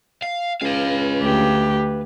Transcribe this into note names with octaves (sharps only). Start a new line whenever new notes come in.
F5
C#2 B4 F5
D2 G4